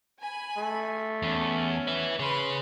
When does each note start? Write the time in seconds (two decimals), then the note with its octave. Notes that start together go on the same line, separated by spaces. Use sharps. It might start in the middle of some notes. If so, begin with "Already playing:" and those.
0.19 G#5 B5
0.57 A3
1.22 E2 C#4
1.87 B4 E5
2.19 G#4 B4 C#5 B5 C6